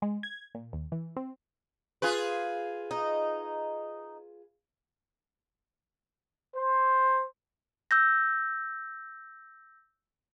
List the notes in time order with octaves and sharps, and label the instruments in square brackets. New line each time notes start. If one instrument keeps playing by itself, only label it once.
[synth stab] G#3
G#6
A#2
D#2
E3
C4
[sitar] F4 G#4 B4
[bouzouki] D#4
[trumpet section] C5
[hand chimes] E6 G6 A#6